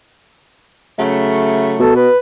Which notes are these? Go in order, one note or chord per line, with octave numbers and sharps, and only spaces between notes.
C#3 F#3 A3
B2 A4
B4